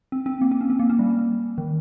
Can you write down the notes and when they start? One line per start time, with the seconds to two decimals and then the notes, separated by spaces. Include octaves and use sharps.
0.12 C4
0.26 C4
0.41 A#3
0.51 C4
0.61 C#4
0.70 C4
0.79 A#3
0.90 C#4
0.99 G3
1.58 D#3